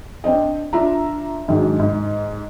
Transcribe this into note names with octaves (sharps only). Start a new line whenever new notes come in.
C4 D4 C5 D#5
D4 F4 E5 A#5
G#2 D#3 F#3 G#3 D4
G#2